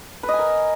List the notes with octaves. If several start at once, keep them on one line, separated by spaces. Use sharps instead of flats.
B4
D#5
G#5
A#4